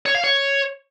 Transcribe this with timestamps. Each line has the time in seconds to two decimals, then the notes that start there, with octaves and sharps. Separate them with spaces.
0.06 C#5
0.15 F5
0.24 C#5